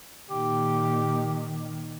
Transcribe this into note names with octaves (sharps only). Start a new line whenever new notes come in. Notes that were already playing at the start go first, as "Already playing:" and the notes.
A#2 D#3 G4